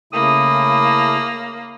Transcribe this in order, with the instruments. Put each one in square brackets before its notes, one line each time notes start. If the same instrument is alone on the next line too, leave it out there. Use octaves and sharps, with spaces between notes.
[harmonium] C#3 A3 E4 [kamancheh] A#3 [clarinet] D#6